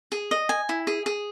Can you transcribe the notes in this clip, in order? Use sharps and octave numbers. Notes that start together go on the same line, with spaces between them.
G#4
D#5
G#5
E4
G#4
G#4